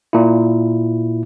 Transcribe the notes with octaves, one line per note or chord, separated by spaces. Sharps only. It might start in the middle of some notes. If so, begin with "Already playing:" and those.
A#2 E4